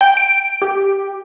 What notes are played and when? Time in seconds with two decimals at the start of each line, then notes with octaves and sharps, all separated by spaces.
0.01 G5
0.17 D7
0.62 G4